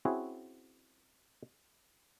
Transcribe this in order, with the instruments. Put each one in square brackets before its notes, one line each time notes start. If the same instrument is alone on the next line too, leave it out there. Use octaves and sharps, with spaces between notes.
[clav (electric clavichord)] C4 C#4 E4 F#4 G#4